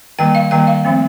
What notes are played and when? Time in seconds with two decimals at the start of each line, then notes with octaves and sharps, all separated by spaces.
0.19 D#3 G3 A#3 G5
0.35 F5
0.51 D#3 G3 A#3 G5
0.67 F5
0.85 F3 A3 C4